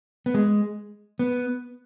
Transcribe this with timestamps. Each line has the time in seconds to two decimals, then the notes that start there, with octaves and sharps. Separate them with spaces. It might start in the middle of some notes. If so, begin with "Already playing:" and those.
0.26 B3
0.34 G#3
1.19 B3